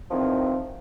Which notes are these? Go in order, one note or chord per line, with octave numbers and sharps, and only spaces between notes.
E2 D#3 F3 C4